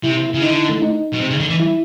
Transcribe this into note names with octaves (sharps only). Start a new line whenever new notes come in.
C3 E4
E4
C#3 E4
D3 D#4
D#4
A3
D#4
B2
C3
C#3
D3
E3
E4